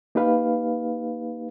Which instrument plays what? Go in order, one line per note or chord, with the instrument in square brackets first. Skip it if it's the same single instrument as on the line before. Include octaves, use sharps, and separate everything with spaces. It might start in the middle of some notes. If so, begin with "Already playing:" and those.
[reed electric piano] A#3 D#4 G4 B4 F5